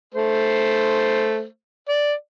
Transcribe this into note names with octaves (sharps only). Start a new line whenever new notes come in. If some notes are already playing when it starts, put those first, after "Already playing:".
A3 C5
D5